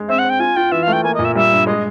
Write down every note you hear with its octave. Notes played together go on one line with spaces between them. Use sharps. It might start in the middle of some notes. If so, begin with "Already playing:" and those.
Already playing: G#3
C4 E5
F#5
C4
G5
F4 G#5
F4 G5
E3 E5
A3 F5
G5
A#3 G#5
A#2 D#5
E5
G3 E5
G2
G#3 D#5